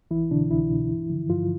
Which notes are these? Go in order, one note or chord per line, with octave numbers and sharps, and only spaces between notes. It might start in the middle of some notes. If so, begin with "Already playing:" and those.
C2 E3 E4
B2 D3 D4
C2 E3 E4
B2
G2
D3 F3
G2 F3 F4